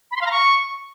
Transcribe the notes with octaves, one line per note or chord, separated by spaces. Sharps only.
B5
C6
F5
A#5
C#6